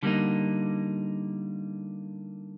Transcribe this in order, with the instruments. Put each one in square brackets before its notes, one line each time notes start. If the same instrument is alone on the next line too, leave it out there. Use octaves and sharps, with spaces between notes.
[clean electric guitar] D3 G3 A#3 D#4